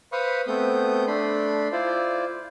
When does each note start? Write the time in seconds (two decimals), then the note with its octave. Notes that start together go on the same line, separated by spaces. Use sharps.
0.12 B4 C5 F5 B5 C#6 D#6
0.47 A3 B3 C4 D#6 G6
1.07 A3 D4 B5 C6
1.72 E4 F4 C5 D5